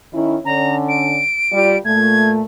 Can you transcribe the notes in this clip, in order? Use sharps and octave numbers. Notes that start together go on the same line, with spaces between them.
D#3 C#4 E4
D3 C#4 A#5
D7
G3 F4
A#2 A3 G#6